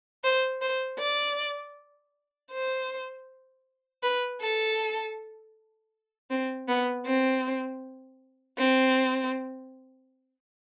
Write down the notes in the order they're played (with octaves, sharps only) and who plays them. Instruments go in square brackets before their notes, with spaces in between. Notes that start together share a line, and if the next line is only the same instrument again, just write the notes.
[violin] C5
C5
D5
C5
B4
A4
C4
B3
C4
C4